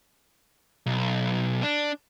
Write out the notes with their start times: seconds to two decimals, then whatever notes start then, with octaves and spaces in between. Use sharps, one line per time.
0.86 B1
1.63 D4